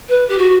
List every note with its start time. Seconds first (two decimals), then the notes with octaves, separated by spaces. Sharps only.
0.08 B4
0.29 G4
0.38 F#4